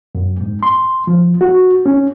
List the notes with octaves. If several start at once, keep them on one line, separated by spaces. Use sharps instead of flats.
F#2
G#2
C6
F3
F#4
C#4